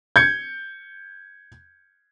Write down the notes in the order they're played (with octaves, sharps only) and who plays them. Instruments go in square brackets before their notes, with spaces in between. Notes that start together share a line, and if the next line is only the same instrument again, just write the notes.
[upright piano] G6 G#6 C#7